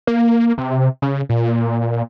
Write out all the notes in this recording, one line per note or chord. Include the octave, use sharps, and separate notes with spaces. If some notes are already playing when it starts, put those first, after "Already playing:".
A#3
C3
C#3
A#2